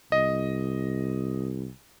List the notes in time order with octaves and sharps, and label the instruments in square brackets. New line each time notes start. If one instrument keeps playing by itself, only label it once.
[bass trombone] C2 [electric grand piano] D#5